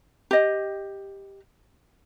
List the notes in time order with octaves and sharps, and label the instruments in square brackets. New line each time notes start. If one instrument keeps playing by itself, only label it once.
[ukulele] G4 D#5